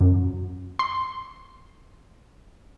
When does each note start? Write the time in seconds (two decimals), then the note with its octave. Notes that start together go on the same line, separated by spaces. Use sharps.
0.01 F#2
0.79 C6